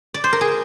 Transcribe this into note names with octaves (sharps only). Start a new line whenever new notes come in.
D5
C5
A#4
G#4